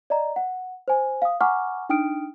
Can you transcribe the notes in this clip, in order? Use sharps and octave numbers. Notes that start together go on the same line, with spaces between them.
D5 D#5 A#5
F#5
C5 G#5
F5 D#6
F#5 G#5 A#5 C#6 D6 F6
D4 D#4 G5 D#6 F6 D7